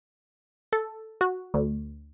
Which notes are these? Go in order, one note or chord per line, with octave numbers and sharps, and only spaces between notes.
A4
F#4
D2